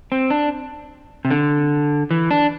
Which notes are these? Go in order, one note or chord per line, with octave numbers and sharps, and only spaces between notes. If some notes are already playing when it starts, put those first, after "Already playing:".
C4
D4
C3
D3
E3
D4